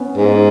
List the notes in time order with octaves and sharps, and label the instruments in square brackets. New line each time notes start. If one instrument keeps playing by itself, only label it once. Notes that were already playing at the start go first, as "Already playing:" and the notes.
Already playing: [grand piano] B3 C#4
[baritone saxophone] G#2